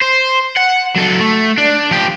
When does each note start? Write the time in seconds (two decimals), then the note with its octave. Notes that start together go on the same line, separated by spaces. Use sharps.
0.02 C5
0.57 F#5
0.96 F#3 A4
1.20 A3
1.58 D4
1.91 F3 G4